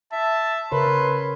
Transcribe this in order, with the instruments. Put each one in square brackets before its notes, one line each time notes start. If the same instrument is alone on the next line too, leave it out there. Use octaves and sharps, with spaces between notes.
[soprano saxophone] E5 [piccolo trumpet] A5
[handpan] C#3 A#4 C#5 [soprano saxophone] B4 [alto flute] B5 [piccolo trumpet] C6